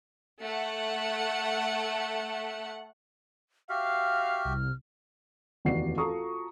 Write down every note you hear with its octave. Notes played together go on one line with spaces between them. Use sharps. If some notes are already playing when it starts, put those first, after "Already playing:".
A3 F#5
F#4 G4 E5 F5 F6
C2
F1 D#2 E3 F#4 D5 C7
F4 F#4 A4 A#5 C#6 D#6